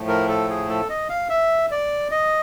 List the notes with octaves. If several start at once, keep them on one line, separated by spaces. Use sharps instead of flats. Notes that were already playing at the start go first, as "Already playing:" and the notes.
Already playing: A2 F3 A3
A#4
A4
G#4
A4
D#5
F5
E5
D5
D#5